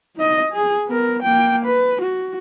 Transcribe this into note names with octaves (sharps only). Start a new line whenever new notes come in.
D#4 D#5
G#4
B3 A#4
A#3 G5
B4
F#4